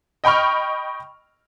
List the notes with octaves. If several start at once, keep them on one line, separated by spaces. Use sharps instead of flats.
D#5 G5 B5 C#6 F6